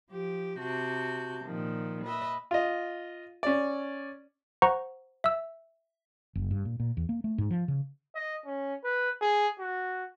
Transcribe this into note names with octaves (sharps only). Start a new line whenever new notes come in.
F3 G4
C3 F#4 A5 G6
A#2 D#3 F3
B4 D#5 E5
F4 D#5
C#4 D5
C5 F#5 A#5 C#6
E5 E6
F#1
G2
A#2
A#2
E2
A#3
A3
G#2
F3
C#3
D#5
C#4
B4
G#4
F#4